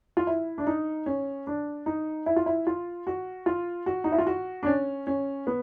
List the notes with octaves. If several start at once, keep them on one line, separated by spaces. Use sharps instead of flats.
F4
E4
D4
D#4
C#4
D4
D#4
E4
F4
E4
F4
F#4
F4
F#4
D#4
E4
F4
F#4
D4
C#4
C#4
B3